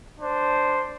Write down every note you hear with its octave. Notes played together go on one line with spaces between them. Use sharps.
D4 C5